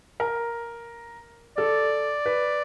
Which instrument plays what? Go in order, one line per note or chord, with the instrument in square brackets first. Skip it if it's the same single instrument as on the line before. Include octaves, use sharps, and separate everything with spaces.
[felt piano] A#4
[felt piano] A4 [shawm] D5
[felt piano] B4